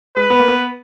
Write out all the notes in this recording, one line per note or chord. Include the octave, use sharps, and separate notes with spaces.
G#3 B4
B3
A#3
B3